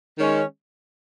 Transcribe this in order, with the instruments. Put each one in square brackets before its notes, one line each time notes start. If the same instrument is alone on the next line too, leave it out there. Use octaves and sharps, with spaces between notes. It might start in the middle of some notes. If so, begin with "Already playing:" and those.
[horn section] D#3 G#3 C#4